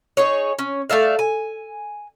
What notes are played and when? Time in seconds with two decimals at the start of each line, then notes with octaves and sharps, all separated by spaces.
0.17 D#4 G#4 C#5
0.59 C#4
0.90 A3 D5 E5 F5
1.19 G#5